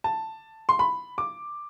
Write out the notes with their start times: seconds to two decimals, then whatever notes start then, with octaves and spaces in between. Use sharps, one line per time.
0.04 A5
0.69 C6
0.79 B5
1.18 D6